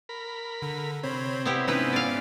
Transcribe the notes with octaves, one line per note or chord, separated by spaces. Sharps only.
A#4 B5
D3
C3 C4 C#5 B5
B3 E4 G4
G#2 B3 C#4 D#4 E4 B4
D5 F5